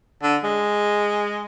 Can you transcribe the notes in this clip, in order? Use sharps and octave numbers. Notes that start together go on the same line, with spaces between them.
D3
G#3